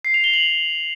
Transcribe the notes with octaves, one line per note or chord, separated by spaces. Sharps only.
C7
F7
G7
F#7